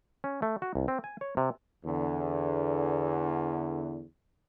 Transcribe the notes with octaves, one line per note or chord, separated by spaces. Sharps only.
C#4
A3
F#4
C2
C4
G#5
C#5
C3
E2 D3